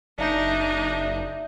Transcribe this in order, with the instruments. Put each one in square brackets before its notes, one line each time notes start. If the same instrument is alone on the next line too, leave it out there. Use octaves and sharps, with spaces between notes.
[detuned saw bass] F#1 [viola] D4 D#4 [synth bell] D5 E5 G6